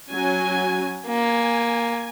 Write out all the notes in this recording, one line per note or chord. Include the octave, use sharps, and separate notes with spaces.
F#3 C#4 G#5
A#3 G#5